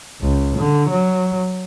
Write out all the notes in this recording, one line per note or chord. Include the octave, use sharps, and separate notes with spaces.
C#2
D3
F#3